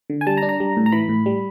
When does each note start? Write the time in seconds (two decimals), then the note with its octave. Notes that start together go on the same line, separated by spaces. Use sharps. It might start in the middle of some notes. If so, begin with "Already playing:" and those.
0.10 D3
0.21 G#5
0.27 G3 A5
0.38 A#5
0.43 D4
0.49 A#5
0.60 G3
0.77 A2
0.86 A#5
0.92 E3 B5
1.09 A2
1.26 G3